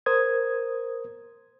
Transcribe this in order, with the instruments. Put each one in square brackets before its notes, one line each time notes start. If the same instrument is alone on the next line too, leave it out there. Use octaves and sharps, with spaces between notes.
[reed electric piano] A#4 C5 D#6 G#6